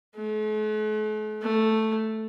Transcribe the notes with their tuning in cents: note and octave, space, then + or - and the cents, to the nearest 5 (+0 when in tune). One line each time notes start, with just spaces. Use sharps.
A3 -45
A3 +0